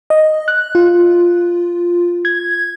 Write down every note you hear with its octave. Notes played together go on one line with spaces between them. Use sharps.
D#5
F#6
F4
G#6